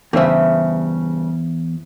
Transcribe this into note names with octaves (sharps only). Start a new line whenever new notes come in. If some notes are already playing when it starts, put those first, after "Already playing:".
E2 G2 C#3 B4 C5 E5